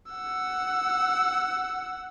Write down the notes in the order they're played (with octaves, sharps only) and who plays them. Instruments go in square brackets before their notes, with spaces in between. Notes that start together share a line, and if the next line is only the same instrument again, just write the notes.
[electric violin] F#5 E6